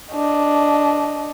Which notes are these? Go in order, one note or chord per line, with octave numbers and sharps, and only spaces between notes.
D4 D#5